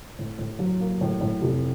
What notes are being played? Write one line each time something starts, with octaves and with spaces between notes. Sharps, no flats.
A2
A2
F#3
A#3
A2
A2
F1